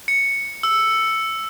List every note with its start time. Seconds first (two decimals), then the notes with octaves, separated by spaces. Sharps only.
0.08 C#7
0.63 E6